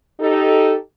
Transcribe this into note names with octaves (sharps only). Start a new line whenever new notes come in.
D#4 G4 A4